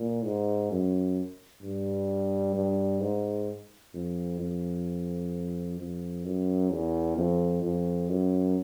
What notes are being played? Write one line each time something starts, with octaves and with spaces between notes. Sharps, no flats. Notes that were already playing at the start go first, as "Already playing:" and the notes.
Already playing: A#2
G#2
F#2
G2
G2
G#2
F2
F2
F2
F#2
E2
F2
F2
F#2